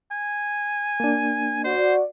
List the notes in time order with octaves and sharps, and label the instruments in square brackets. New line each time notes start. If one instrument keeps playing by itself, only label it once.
[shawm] G#5
[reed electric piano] A#3 D4
[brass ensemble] F#4 D5 [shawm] C5